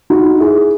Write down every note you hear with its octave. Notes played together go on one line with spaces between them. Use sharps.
D#4 F#4
E4 G#4